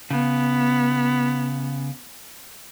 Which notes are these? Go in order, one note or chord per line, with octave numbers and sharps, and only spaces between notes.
C#3 B3